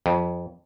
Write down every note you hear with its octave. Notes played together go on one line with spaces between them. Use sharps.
F2